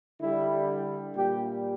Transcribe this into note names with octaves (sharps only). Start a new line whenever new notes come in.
D3 G3 E4
A#2 G3 G4